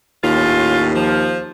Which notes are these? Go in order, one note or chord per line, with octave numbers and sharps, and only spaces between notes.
D#2 A2 C#4 F4
F3